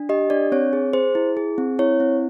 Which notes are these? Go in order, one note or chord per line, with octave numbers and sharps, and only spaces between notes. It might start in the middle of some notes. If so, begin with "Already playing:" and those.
Already playing: D4
G4 D#5
D4 D5
C4 C#5
G#4
G#4 C5
E4
G#4
C4
E4 C#5
C4